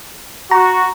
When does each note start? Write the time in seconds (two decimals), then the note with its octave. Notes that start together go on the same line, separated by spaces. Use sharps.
0.51 F#4 A#5